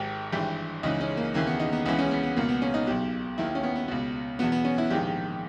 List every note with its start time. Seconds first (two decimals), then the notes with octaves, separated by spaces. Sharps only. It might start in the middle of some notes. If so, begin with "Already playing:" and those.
Already playing: G#1 G#2 D#3 G4
0.33 G#1 G2 E3 G4
0.83 C#2 C#3 E3 D#4
1.00 C#4
1.17 A#3
1.34 D#2 C#3 E3 A#3
1.47 B3
1.60 D#4
1.73 B3
1.86 C#2 C#3 E3 B3
1.99 C#4
2.11 B3
2.23 B3
2.36 C#2 B2 A#3
2.49 B3
2.62 C#4
2.74 D#4
2.87 B1 B2 G4
3.38 D#2 D#3 E4
3.55 C#4
3.63 B3
3.76 B3
3.88 C#2 B2
4.39 E2 B2 B3
4.52 B3
4.64 C#4
4.78 E4
4.90 A#1 G#2 D#3 G4